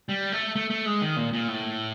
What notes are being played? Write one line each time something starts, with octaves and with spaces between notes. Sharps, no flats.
G3
A3
A3
A3
G#3
D#3
A#2
A#2
A2